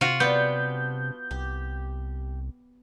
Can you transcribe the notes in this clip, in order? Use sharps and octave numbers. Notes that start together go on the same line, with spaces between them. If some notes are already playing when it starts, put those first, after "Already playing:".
C3 F4 F#4
G3 B3 D4 G6
C2 G4